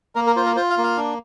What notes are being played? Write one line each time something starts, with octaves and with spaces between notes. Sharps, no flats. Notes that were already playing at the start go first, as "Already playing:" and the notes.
A#3 A#4
A#4
F4 C5
A#4
F4 C5
F5
A#3
F5
D4